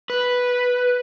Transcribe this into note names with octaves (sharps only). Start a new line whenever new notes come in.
B4